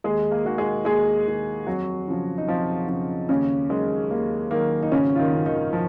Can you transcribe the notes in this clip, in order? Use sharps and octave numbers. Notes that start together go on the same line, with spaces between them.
D#2 G#3 G#4
A#3 A#4
D#3 G#3 F#4
G#3 G#4
D#2 G#3 G#4
D#3 G#3
F2 F#3 F#4
C#3 F3
D#4
F2 F3 F4
C#3 F3
D#2 C#3 C#4
D#3 F#3 G#3
D#2 A#3
D#3 A#3
F#3
D#4
G#1 C#3 C#4
F4
D#3 D#4
F#2 C#3
D#3 D#4
F3